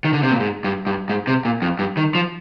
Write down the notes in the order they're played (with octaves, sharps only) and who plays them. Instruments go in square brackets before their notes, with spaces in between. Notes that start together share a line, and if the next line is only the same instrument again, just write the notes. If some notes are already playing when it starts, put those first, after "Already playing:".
[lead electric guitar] D#3
D3
C3
A#2
G#2
G2
G2
G#2
C3
A#2
F2
G2
D#3
F3